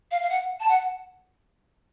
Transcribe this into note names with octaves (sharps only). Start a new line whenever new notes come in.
F5
F5
F#5
A5
F#5